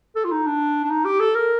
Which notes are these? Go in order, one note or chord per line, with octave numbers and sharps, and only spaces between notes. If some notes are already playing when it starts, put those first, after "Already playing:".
A4
F4
D#4
D4
D4
D#4
G4
A4
A#4